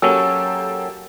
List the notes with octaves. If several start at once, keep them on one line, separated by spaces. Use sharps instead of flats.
F#3 A#3 C#4 G4 A4 E6